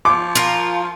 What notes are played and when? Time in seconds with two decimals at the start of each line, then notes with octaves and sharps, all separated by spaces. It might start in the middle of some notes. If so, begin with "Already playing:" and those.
0.05 F3 D6
0.35 F4 A#4